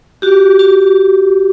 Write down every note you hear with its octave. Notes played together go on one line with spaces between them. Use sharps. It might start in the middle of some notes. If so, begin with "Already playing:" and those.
F#4 G4
F#4